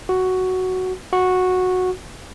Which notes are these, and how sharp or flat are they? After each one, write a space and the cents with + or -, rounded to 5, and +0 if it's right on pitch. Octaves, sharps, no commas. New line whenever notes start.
F#4 +5
F#4 -10